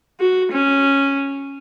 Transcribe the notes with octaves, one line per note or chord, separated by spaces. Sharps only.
F#4
C#4